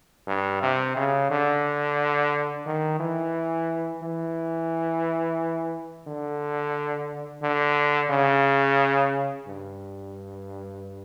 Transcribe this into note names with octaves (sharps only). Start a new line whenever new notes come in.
G2
C3
C#3
D3
D#3
E3
E3
D3
D3
C#3
G2